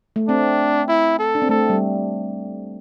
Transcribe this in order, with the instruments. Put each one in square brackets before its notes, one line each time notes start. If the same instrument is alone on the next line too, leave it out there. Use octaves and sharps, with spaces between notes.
[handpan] A3
[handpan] C4 [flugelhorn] D4
[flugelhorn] E4
A4
[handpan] D4
C4
[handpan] A3 [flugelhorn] A4
[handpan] G3